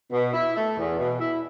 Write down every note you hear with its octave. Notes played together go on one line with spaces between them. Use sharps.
B2
E4
A3
E2
B2
E4